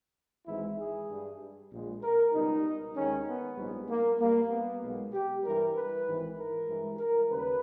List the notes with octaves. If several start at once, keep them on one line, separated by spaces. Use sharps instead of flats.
G#1 G#2 E3 G#3 E4
G#4
G2 G3
A#1 A#2 G#3
A#4
C#2 B2 G3 D#4
D#2 D#3 G#3 C#4
B3
A#1 G#2 G3
A#3
G2 G3 A#3
B3
B1 B2 G#3
G4
G2 E3 G3 A#4
B4
G#1 G#2 E3
A#4
G2 E3 G#3
A#4
D#2 C#3 G3 B4